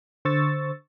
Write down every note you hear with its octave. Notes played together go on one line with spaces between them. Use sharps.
D3 C5 C#6 E6 A6